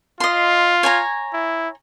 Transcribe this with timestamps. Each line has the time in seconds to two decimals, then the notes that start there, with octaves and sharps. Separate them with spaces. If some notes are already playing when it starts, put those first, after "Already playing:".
0.20 F4 D#5 C6
0.83 C#5 G#5 A#5
1.33 E4